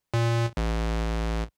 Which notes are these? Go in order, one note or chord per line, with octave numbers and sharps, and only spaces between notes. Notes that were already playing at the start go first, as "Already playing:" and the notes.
A#2
A1